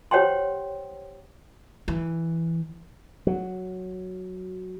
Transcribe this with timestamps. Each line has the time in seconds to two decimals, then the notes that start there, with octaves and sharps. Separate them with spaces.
0.11 G4 C5 C#5 F#5 G5 C6
1.88 E3
3.27 F#3